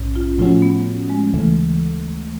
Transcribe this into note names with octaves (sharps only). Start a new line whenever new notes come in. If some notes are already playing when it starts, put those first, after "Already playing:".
Already playing: A#1 G#2 C#4
F4
A2 F3 A3 C#4 F4 F#4
B3
G#3
D2 C#3 E3 A3